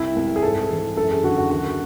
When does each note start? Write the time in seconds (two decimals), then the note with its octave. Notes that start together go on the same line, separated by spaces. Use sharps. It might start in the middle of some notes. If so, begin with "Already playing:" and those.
Already playing: C2 E4
0.16 C2
0.36 G#4
0.43 G#2 A4
0.70 E3
0.96 F#2 A4
1.11 G#4
1.23 D3 F#4
1.38 F#4
1.50 D#2 F#4